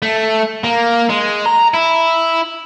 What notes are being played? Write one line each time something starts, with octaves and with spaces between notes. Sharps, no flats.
A3
A#3
G#3
A#5
E4